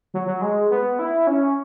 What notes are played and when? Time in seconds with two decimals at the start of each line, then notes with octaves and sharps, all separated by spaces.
0.14 F#3
0.27 F#3
0.42 G#3
0.71 B3
0.99 E4
1.27 C#4